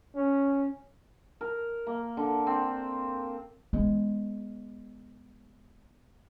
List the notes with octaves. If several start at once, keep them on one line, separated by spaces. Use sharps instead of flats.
C#4
A#4
A#3
D3
C4
G#3 B3